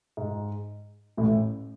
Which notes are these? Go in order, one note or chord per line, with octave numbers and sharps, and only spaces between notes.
G#2
A1 A2